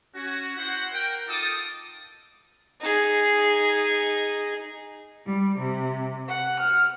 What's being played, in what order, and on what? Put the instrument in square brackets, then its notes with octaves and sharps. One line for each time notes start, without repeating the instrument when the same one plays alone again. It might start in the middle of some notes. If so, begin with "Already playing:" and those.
[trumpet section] C#4 F#4
E4 F#4 C5 F#5
A#4 G5
D#4 F4 A4 A5 D6 D#6
[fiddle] D#4 G#4
[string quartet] G3
C3
F#5
F6